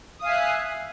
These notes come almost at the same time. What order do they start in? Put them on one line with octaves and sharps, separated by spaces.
D#6 F5 G#5 E5 F#6